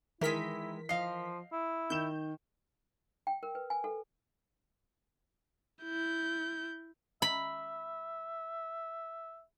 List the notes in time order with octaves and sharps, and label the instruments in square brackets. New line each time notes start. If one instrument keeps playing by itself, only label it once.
[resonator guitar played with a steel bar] D#3 G#3 [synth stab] E3 A#4 B6 [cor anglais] E4
[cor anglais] F3 [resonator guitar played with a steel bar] D#5 F5 [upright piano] C7
[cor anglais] E4
[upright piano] D#3 E7 [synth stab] G6
[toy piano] G5
A#4
B4
G#5
A4
[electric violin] E4 G6
[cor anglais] E5 [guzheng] B5